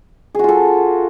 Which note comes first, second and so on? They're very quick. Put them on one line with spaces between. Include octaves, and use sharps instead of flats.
G#4 F#4 F4 A4